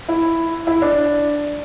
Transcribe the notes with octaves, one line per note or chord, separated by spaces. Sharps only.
E4
E4
D4